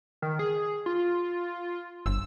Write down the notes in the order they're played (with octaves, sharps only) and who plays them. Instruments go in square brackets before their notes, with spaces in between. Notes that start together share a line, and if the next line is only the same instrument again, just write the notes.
[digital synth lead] D#3
G#4
F4
[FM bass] G1 [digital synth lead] E6